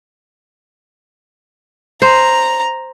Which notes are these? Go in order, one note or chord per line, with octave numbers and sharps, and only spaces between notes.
C5 A#5